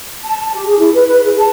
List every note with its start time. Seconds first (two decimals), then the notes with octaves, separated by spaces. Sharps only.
0.24 A5
0.38 A5
0.55 G4
0.68 G#4
0.79 E4
0.94 B4
1.07 B4
1.25 G#4
1.39 A5